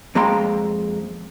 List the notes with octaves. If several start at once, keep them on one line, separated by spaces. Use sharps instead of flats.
F2 G#3 A#3 G5 A#5 C6